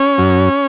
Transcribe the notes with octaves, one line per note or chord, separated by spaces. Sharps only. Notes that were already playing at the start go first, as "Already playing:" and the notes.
Already playing: C#4
F#2